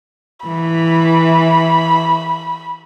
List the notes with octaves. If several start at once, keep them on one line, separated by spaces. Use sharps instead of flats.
E3 B5